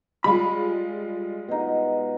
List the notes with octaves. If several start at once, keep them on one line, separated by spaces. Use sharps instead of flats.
G3 G#3 F4 B5
B2 D#4